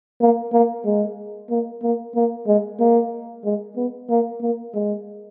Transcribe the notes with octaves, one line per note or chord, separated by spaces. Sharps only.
A#3
A#3
G#3
A#3
A#3
A#3
G#3
A#3
G#3
B3
A#3
A#3
G#3